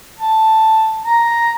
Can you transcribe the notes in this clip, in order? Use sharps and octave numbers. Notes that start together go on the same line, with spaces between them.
A5
A#5